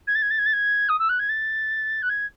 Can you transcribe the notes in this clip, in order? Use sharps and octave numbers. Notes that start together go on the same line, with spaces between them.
G#6
A6
G#6
A6
G#6
A6
G#6
D#6
E6
F#6
G#6
A6
F#6
G#6